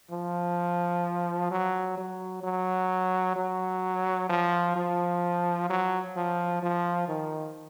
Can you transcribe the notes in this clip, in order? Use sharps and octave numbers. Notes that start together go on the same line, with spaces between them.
F3
F#3
F#3
F#3
F#3
F3
F3
F#3
F3
F3
D#3